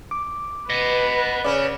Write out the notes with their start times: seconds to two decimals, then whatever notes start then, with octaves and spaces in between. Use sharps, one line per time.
0.11 D6
0.70 B4 D#5 F#5
1.44 C#3 C#4 D5